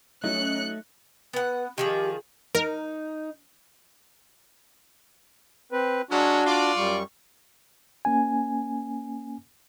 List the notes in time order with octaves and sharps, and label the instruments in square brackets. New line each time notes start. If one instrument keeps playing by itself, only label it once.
[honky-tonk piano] F#3 D#4 [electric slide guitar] A3 [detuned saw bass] C#4 [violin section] F#6 C#7
[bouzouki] B3 F#5 [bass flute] B4
[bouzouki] D#3 F3 G#4 [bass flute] G4
[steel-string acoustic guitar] D#4 [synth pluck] A#4
[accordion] C4 B4
[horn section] F#3 G#3 C#4 [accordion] D4 F#4
[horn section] F4 D5
[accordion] F#2 G3 C#6
[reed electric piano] A#3 C#4 G#5